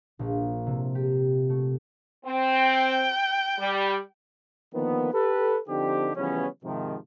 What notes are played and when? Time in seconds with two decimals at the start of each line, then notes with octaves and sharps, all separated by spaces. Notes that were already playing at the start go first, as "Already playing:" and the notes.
0.19 A#1
0.66 C3
0.95 G4
1.49 A3
2.25 C4
2.55 G5
3.59 G3
4.74 D3 D#3 F3 A#3 B3
5.13 G4 A4 B4
5.69 D3 F3 C4 D#4 G4
6.16 C#3 E3 F3 G3 B3 C#4
6.64 G#2 C3 D#3 F3